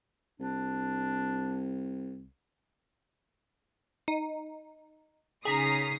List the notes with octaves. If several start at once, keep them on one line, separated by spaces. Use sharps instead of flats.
C2 D4
D#4
C#3 C#4 D#4 G#4 A#5 D#6 B6 C7